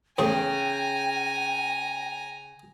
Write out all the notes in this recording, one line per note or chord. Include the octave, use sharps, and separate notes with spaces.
E2 A2 C#3 G#4 G5 G#5 A#5 C#6